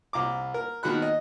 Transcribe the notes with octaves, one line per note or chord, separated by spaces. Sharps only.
C2 A#5 D6
A#4
B2 D#3 F#4 F#5 B5 F#6
D#5